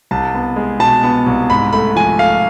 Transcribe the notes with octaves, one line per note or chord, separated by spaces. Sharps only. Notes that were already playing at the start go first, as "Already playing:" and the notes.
C2 A5
B3
G#3
B2 A5
B3
C2
G#2 B5
A3 B5
F3 G#5
A3 F5